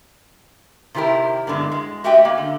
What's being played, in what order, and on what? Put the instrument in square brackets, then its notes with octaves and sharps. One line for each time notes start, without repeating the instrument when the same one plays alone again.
[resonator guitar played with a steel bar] C3 D#3 E4 G4 A#4
G2 B2 D3 G#3
G#3
A3 F#4 G4 D#5 E5 G5
A#3
D3